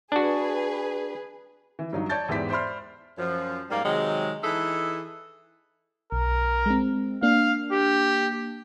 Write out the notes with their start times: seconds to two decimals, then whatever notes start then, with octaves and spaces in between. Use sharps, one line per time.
0.12 D4 F#4 G#4 B4
1.79 E3
1.93 G2 F#3 D#4
2.09 C#5 D5 A5 G6 A6
2.29 E2 G#2 E3 G4 D5 B6
2.50 C5 D5 E5 B5 C6 F6
3.18 F#2 F3
3.70 G#2 G3 A#3
3.83 C3 D#3 F#3 G#3
4.42 E3 D#4 G#4 A4 E5
6.12 B1 A#4
6.66 G#3 C4
7.22 A#3 D4 F5
7.72 G4